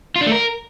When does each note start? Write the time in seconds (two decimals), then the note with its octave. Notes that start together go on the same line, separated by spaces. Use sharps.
0.16 F4
0.21 D4
0.26 A3
0.32 A#4